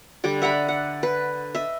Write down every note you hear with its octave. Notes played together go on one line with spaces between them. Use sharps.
D3 G3 D5
E5 F#5 A#5 B5
F#5
B4
D#5 E5